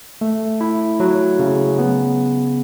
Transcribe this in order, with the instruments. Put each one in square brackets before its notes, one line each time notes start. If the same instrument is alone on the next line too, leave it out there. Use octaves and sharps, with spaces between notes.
[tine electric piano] A3
E4
F#3
C#3
B3